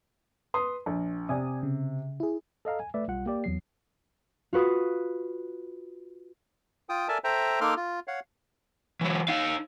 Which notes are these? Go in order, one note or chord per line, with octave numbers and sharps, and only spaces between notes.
B4 C6 D#6
A#1
C3 D5 G#5 D#6
C#3
E4 G#4
A4 D#5 F5 A#5
G#5
A3 B4 D5 E5
B1 G3 F4 F#5
A#3 G4 D5
E2 F#3 C7
F4 F#4 B4 D#6
F4 G5 D#6
A4 A#4 D5 E5 G#5 A5
A4 C5 E5 G5 A#5
A#3 D#4 A4 C6 D6 F6
F4
C#5 F5 F#5
E3 F#3
D#4 F5